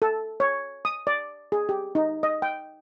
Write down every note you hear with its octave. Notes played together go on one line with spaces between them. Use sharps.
A4
C#5
D#6
D5
G#4
G4
D#4
D#5
G5